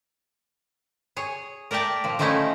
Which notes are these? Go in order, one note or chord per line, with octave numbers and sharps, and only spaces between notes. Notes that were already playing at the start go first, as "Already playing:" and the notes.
G#4 C#5
A#4 D5 E5 G5 A5
A#2 F3
D#3 F3 A3 C#4 D#4 E4